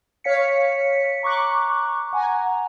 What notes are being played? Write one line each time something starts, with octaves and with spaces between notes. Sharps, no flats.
C#5 F5 B6 C#7
A#5 C#6 D6 F#6
F#5 G#5 A#5